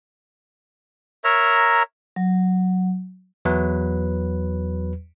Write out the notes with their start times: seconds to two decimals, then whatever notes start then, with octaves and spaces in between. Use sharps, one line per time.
1.24 A#4 C#5 E5 A#5
2.16 F#3
3.45 E2 F#3 B4